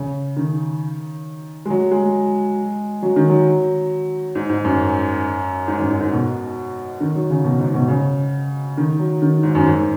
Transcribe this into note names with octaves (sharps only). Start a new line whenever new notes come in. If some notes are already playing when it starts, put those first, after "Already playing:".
Already playing: C#3
D#3
G#3
F#3
G#3
F#3
D#3
F#3
G#2
G#2
F#2
G#2
F#2
G#2
G#2
B2
D#3
F#3
C#3
B2
G#2
B2
C#3
D#3
F#3
D#3
G#2
F#2
G#2